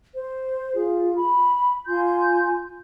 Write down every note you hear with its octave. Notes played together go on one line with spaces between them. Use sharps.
C5
F4 G#4
B5
F4 G#5 C6 G6